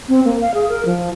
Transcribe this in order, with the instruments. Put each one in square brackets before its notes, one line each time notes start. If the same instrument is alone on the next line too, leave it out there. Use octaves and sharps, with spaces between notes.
[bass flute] C4
A#3
F5
G#4
A#4
F3